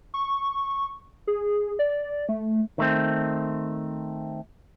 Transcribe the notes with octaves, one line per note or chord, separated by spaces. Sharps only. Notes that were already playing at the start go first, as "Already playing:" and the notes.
C#6
G#4
D5
A3
D#3 A3 C4